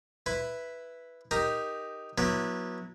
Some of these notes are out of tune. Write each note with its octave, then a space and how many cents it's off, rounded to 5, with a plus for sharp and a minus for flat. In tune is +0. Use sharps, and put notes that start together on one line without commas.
E4 +0 B4 +0
D#4 +0 G4 +0 A#4 +0
F#3 -20 B3 -35 E4 -20